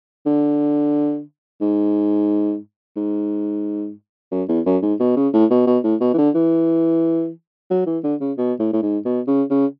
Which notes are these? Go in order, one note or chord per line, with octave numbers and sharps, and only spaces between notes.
D3
G#2
G#2
F#2
E2
F#2
G#2
B2
C#3
A2
B2
B2
A2
B2
E3
D3
E3
F#3
E3
D3
C#3
B2
A2
A2
G#2
B2
C#3
C#3